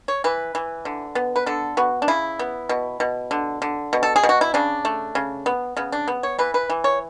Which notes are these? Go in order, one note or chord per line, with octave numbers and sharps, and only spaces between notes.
C#5
E3 B4
E3
D3
B3
B4
D3 A4
B3 F#4
D4
C#3 E4
B3
B2
B2
D3
D3
B2
A4
G#4
B2
F#4
E4
C#3 D4
A3
C#3
B3
C#3 B3
D4
B3
C#5
E3 B4
B4
E3
C#5